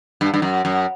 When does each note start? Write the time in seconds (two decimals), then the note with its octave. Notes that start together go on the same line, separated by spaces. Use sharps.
0.21 G2
0.34 G2
0.42 F#2
0.65 F#2